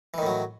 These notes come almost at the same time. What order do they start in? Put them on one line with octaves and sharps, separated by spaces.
E3 D#3 A2 F#3